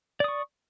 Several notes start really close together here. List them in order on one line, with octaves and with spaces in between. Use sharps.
D5 D#6 C#6